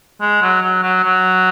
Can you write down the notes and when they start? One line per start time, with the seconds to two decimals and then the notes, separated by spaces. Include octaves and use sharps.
0.21 G#3
0.42 F#3
0.63 F#3
0.83 F#3
1.04 F#3